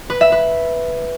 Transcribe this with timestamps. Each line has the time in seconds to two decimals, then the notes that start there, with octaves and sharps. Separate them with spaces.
0.10 B4
0.21 E5
0.32 B4